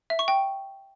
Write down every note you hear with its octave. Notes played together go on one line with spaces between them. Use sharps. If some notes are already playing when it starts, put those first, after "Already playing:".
E5
C#6
G5